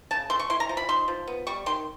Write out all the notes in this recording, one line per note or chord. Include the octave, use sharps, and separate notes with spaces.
C#3 A5
A3 C6
C#6
E4 C6
A#5
F3
B5
D#4 C6
F3
B3
G3 C#6
D#3 C6